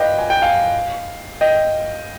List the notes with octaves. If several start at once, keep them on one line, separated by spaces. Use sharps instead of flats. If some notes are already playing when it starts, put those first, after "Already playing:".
Already playing: B4 D5 D#5 F5 G5
G#5
G5
F5 G#5
D#5 G5